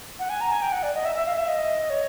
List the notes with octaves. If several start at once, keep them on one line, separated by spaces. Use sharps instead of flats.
F#5
G#5
A#5
G#5
G5
F#5
D5
D#5
E5
E5
F5
E5
D#5
C#5